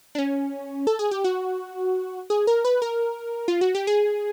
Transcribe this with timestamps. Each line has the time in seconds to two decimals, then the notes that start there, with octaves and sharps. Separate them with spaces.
0.15 D4
0.18 C#4
0.87 A4
0.99 G#4
1.11 G4
1.24 F#4
2.30 G#4
2.47 A#4
2.65 B4
2.82 A#4
3.48 F4
3.61 F#4
3.75 G4
3.87 G#4